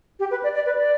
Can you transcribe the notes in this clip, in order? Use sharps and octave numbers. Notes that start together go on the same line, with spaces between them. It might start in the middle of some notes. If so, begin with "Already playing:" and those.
G4
B4
D5
D5
B4
D5